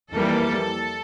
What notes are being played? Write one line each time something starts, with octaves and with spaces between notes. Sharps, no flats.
F2 E3 G3 A#3 A4